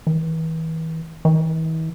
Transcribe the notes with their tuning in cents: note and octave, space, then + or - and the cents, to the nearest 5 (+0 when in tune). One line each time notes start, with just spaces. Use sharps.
E3 -35
E3 -45